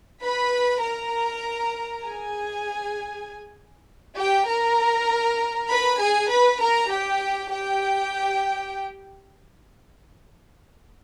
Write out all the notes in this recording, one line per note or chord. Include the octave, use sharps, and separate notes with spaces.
B4 B5
A#4 A#5
G#4 G#5
G4 G5
A#4 A#5
B4 B5
G#4 G#5
B4 B5
A#4 A#5
G4 G5
G4 G5